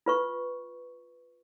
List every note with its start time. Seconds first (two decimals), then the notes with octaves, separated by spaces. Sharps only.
0.06 F4 B4 C#6